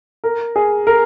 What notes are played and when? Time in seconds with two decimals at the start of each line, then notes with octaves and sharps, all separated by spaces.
0.24 A#4
0.56 G#4
0.87 A#4